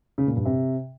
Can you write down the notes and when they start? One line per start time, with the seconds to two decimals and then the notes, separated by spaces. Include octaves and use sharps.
0.18 C#3
0.27 A#2
0.36 G2
0.45 C3